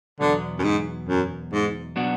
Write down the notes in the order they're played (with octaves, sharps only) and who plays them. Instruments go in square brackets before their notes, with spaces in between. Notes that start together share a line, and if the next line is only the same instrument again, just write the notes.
[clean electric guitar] E2 B2 F#3 B3 [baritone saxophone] D3
[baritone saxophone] F#2
G#2
F#2
G#2
[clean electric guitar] B2 F#3 B3 D4 F#4